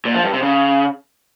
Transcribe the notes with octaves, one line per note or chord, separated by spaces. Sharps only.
A#2
F3
G2
C3
C#3